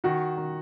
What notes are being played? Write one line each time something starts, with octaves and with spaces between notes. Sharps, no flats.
D#3 F#4
D#3